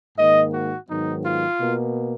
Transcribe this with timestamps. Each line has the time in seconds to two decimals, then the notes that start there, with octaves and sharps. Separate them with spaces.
0.17 G#2 D#3 A#3 D#5
0.52 F#4
0.88 G#2 D#3 F#3 B3 D#4
1.24 F4
1.59 B2 A#3